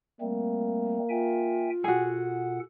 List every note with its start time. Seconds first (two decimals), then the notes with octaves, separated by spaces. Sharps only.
0.21 G3 A3 A#3 C4
1.09 F4 E5 G5 G#5
1.84 B2 F#4 G#4 A4 F#5